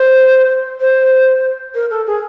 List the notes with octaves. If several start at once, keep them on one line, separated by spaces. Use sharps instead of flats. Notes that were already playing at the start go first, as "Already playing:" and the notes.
Already playing: C5
C5
A#4
A4
G#4